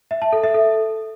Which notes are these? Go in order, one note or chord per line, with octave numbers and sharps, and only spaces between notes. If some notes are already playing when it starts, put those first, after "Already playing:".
E5
A5
A4
E5
A4